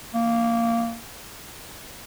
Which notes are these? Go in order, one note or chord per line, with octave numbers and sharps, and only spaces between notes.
A#3